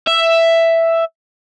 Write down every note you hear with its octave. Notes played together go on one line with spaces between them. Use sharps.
E5